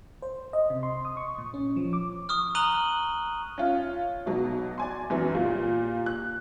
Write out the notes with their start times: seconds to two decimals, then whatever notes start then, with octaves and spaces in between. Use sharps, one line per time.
0.22 C5
0.53 D#5
0.70 C3
0.83 C6
1.05 D#6
1.17 C#6
1.38 A#2
1.54 C#4
1.76 F3
1.93 D6
2.29 C#6 D#6 F6
2.55 A#5 D#6 F#6 D#7 F#7 G7
3.58 C#4 F4
4.26 B1 B2 F#3
4.78 D5 G#5 C6
5.10 F#2 E3 F#3
5.34 A#2 G3 A#3
6.06 F#6